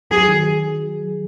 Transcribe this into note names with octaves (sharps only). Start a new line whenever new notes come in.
F#3 G#4
D#3
G#4